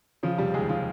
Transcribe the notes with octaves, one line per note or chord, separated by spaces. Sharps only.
C#3 F3 F4
F1 G3 G4
D#2 G#3 G#4
F3 F4